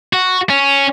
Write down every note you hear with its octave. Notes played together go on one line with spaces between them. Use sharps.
F#4
C#4